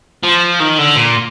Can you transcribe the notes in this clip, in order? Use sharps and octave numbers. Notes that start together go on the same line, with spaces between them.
F3
D#3
D3
A#2